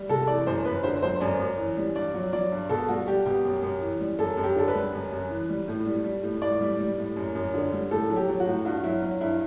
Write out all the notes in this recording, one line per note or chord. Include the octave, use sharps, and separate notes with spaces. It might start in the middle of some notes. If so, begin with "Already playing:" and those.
Already playing: G3
C3 A4
E3 D5
F#2 C5
F#2 B4
D3 C5
F#3 C5
F#2 D5
F#2
E3
G3
G2 D5
F#3
F#3 D5
G2
B2 A4
G3 F#4
G3 G4
B2 G4
F#2
F#2
E3
G3
F#2 A4
F#2
G4
D3 A4
B4
G3
F#2
F#2
E3
G3
A2
G3
G3
A2
A2 D5
G3
G3
A2
F#2
F#2
D3
G3
A2 A4
F#3
G4
F#3
F#4
A2
G2 F#4
F#3 E4
F#3
G2 E4